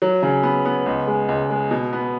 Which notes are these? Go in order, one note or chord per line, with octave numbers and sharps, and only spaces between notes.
F#3
C#3
B3
B3
C#2
G#3
C#2
G#3
B2
B3